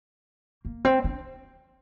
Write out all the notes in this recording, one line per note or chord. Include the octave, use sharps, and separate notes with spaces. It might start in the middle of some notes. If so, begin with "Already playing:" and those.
A#3
C4
D4